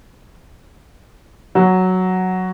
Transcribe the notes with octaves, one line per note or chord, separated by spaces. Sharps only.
F#3